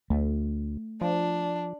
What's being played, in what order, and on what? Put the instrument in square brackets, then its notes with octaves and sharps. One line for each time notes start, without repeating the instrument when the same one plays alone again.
[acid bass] D2 [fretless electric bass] A3
[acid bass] F3 [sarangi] D4